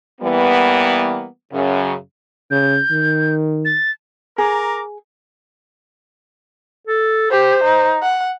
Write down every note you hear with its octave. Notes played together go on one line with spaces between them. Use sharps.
E3 G3 A#3 B3
F#2 C#3
C#3 G6
D#3
A6
G#4 A#4 A#5 D6
A4
G4 C5
D#4
F#5